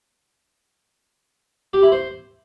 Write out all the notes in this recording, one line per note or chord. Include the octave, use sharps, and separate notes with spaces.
G4
E4
C5